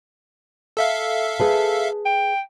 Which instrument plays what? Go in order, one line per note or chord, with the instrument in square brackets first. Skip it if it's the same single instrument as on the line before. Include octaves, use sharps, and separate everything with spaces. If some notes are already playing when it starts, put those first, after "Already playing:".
[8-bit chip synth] A4 E5 F5
[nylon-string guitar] G#4 B4 A5
[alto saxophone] G5